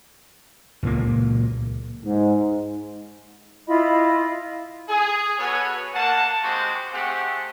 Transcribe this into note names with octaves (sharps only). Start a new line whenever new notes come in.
C#2 A#2 A#3
G#2
E4 F4 D#5 B5
G#4
B3 F#4 A4 B4 C#5 G#5
A#3 F#5 A5
G#3 C4 F#4 G4 C5
A3 C4 G4 G#4 C5 F#5